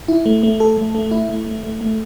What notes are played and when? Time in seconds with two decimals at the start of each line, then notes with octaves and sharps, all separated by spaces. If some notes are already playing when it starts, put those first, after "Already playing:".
0.08 E4
0.26 A3
0.43 A3
0.60 A4
0.77 A3
0.95 A3
1.11 E4
1.29 A3
1.46 A3
1.63 A3
1.81 A3